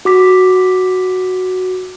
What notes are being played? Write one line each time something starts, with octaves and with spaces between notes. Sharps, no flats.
F#4 D6 B6